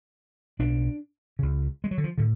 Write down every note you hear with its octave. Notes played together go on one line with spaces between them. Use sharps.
B1 B2 D4
C#2 C#3
G#3
F#3
D3
F3
A2 D3